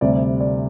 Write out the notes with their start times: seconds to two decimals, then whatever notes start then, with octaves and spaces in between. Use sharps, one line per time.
0.01 D2 C3 G3 D5
0.40 D5